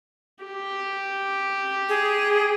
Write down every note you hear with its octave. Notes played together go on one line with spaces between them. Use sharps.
G4
G#4